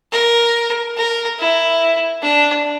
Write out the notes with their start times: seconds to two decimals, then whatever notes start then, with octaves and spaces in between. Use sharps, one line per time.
0.12 A#4
0.97 A#4
1.39 E4
2.22 D4